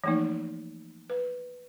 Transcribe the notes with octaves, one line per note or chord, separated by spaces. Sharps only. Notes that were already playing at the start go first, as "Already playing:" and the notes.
E3 F3 A3 A#3 D#4
B4